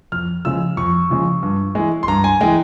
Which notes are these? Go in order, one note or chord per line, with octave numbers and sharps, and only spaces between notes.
F2 F6
C#3 F3 G#3 E6
F2 C#6
C#3 F3 G#3
G2
E3 G#3
C6
G2 A#5
G#5
E3 G#3 G5